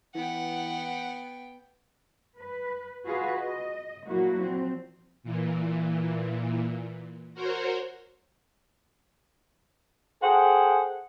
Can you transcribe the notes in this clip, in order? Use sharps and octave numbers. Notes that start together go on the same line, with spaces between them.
E3 B3 F#5 G5
B4
F4 F#4 G#4 B4 F5
D#5
A#2 F3 F#3 A#3 E4 F#4
F3 C4
A#2 E3
F#4 A#4 C5 C#5
G#4 A4 C5 F#5 G5